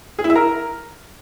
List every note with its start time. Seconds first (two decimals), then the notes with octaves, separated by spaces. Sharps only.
0.19 G#4
0.24 E4
0.30 E5
0.35 A#4